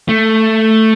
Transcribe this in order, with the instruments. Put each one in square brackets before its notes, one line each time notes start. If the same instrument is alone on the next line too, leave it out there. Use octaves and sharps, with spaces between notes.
[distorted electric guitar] A3